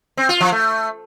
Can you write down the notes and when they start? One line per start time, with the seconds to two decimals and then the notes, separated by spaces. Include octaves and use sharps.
0.17 C4
0.29 F4
0.41 F3
0.52 A3